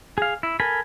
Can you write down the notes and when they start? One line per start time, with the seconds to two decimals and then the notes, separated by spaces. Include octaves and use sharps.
0.18 G#4 F5
0.43 E4
0.60 A4 A#4 G#5 B5